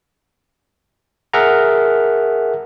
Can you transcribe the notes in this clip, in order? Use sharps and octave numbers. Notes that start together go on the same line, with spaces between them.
G#4 A#4 E5 F#5 A#5